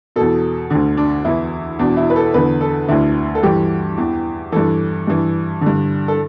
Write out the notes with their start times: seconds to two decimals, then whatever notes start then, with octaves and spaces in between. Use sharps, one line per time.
0.16 E2 B2 A4
0.70 D2 D3
0.97 D4
1.25 E2 E3 E4
1.79 E2 B2 D4
1.97 E4
2.10 B4
2.16 A4
2.34 E2 D3 B4
2.61 A4
2.88 D2 D3 E4
3.35 A4
3.43 G2 E3 G4
3.98 E2 E3
4.52 G2 E3 A4
5.07 G2 E3
5.61 D3
5.66 G2
6.08 A4